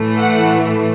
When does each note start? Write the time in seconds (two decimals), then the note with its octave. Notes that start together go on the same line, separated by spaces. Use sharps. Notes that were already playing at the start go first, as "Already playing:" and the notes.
Already playing: A2 E3 A3
0.19 F#5